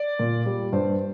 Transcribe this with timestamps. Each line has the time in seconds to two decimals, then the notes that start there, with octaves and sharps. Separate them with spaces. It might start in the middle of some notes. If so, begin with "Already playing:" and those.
Already playing: D5
0.19 A#2
0.46 G3
0.72 G2 C5